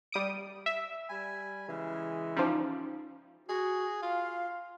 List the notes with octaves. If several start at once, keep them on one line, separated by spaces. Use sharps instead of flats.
G3 D#6 D7
E5
G3 G#5 B5
C#3 E3 G#3
F3 G3 C#4 D#4
F#4 G#4
F4 F5